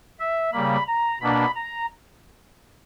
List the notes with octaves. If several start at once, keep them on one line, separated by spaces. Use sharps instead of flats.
E5
C#3 G3 A#3 B5
A#5
B2 A#3 D4 B5
A#5